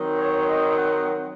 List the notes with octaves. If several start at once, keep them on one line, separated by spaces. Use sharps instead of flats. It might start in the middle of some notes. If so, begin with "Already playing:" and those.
Already playing: D#3 F#3 C4
C#5
D#5
F#5